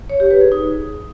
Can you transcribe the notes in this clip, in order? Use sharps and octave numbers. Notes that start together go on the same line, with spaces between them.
C#5
G4
B4
G#4
D#4